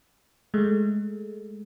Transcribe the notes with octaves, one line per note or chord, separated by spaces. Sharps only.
G#3 A3